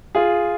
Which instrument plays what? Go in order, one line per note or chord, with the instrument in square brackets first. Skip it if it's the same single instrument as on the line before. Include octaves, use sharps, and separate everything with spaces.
[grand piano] F4 G#4